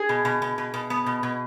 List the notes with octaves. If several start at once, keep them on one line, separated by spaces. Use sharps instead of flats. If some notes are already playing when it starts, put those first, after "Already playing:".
Already playing: G#4
B2
B2
B2
B2
B2
B3
B2
B2